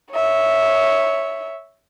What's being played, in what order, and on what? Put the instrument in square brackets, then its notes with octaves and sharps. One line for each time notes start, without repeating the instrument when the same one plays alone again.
[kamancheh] C#5 E5